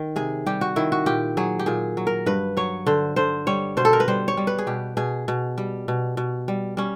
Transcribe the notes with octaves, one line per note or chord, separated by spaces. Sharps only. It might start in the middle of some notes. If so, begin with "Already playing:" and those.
Already playing: D#3
C3 G#4
G3 G4
F#4
D#3 E4
F#4
A#2 G4
F#3 G#4
G4
A#2 G#4
F#3
A#4
G2 B4
F#3 C#5
D3 C5
D3 C5
G3 C#5
B2 C5
A4
A#4
B4
G3 C5
C#5
G3
B4
G#4
B2 G4
B2 G#4
B2
G3
B2
B2
G3
G3 C#4